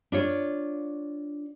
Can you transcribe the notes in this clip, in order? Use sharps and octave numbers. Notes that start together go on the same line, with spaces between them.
D4 F4 C#5